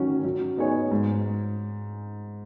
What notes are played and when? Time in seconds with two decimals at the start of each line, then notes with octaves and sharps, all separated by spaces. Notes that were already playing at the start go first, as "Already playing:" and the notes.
Already playing: D#3 F#3 C#4 F#4
0.24 F#3
0.57 B3 D#4 G#4 C#5
0.91 G#2